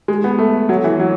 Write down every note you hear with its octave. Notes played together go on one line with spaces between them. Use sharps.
G#3
B3
A3
F#3
E3
F#3